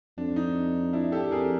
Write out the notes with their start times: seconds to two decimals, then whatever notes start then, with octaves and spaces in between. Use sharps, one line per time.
0.18 F2 D4
0.36 D#4
0.93 D4 E4
1.12 G4 A4
1.31 F2 G#4 A#4